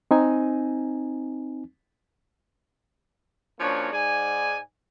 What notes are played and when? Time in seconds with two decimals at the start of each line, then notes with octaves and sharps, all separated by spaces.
0.11 C4 D#4 G#5
3.60 F3 A#3 C#4 D4 F#4 C#5
3.93 G#2 D5 G#5